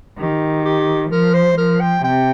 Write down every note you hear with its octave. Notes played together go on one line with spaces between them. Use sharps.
D#3 G4
G4
F3 A#4
C5
F3 A#4
G5
C3 G5